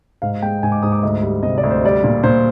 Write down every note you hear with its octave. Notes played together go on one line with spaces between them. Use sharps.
G#2 F5
G#3 G5
G#2 G#5
D6
G#2 D#6
D6
D2 D#5
G3
C3 D#5
D5
D2
C5
G3 D5
A#2
A#2 C5